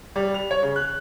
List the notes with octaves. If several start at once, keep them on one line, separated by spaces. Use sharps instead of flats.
G3
F7
C#5
C#3
F#6